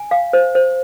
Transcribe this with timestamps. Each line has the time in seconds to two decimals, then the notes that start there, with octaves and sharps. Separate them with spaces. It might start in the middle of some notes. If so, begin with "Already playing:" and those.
Already playing: G#5
0.11 F5
0.33 C5
0.55 C5